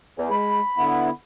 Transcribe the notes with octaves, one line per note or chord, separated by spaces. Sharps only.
E2
G#3 B5
D3 B3 E4